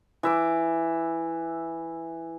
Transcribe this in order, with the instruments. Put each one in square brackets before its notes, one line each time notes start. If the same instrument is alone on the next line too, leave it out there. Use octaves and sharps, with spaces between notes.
[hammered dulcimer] E3 E5 D6